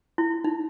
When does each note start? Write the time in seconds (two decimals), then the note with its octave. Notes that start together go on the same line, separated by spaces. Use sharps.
0.18 E4
0.44 D#4